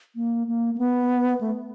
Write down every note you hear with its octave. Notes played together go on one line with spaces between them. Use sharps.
A#3
A#3
A#3
B3
A3